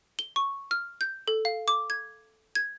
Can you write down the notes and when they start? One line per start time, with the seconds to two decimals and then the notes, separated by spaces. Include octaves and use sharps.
0.19 G7
0.36 C#6
0.71 F6
1.01 G6
1.28 A4
1.45 F5
1.68 D6
1.90 G#6
2.55 G#6